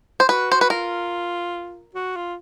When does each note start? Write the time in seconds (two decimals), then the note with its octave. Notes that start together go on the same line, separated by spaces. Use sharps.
0.20 C5
0.29 F#4 B4
0.52 C5
0.61 B4
0.70 F4 A#4
1.95 F#4
2.16 F4